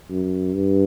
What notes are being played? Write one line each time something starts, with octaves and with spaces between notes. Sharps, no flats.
F#2
G2